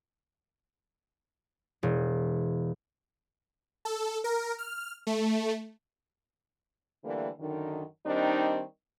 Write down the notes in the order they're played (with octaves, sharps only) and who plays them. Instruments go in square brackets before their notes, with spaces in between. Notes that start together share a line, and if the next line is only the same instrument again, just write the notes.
[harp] E1
[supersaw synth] A4
A#4
F6
A3
[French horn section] D3 E3 G3 A3 A#3
F#2 D3 D#3
D#3 G3 C4 D4 D#4